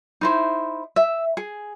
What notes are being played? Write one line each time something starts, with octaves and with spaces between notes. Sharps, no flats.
D#4 E4 C5
E5
G#4